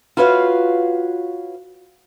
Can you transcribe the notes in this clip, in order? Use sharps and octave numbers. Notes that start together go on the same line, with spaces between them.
F4 F#4 B4 C#5 F5